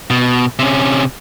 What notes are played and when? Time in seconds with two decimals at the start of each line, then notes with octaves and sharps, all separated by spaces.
0.10 B2
0.59 C3 C#4